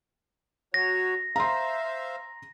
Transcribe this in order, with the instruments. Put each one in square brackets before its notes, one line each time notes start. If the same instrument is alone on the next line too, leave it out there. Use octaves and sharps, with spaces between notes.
[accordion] F#3 F#4 C#5 [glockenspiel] A#6
[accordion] C5 E5 F5 [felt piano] A#5 C6